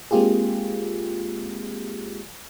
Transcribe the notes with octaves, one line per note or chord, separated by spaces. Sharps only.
G#3 A#3 C4 F4 G4 G#4